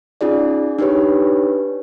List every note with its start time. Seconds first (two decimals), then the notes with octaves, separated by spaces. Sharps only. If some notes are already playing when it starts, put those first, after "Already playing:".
0.21 C#4 D#4 F4 G#4 D5
0.79 D4 D#4 G4 B4 C#5